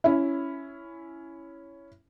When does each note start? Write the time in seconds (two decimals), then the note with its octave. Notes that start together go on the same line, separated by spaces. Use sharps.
0.04 C#4 E4